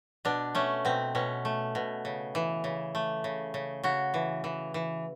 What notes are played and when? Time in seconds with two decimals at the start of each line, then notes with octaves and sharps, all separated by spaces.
0.25 B2 D4
0.55 A3 C#4
0.85 B2 C4
1.15 B2 C#4
1.45 A3
1.75 B2
2.05 C#3
2.35 E3
2.64 C#3
2.95 A3
3.24 C#3
3.54 C#3
3.83 C#3 F#4
4.14 E3
4.44 E3
4.74 E3